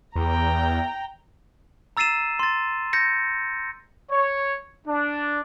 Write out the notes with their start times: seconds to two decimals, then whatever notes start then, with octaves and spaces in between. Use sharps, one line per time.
0.16 E2 G5 A#5
1.97 A#5 E6 A6 C7 D#7 E7
2.39 C6 A6
2.93 G6 A#6 C#7
4.10 C#5
4.86 D4